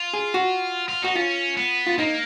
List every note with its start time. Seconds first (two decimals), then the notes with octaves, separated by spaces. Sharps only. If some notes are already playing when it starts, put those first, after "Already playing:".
Already playing: F4
0.14 G#4
0.34 F#4
0.89 F4
1.02 D#4 F#4
1.16 C#4 F4
1.57 B3
1.87 F4
1.99 A#3 D#4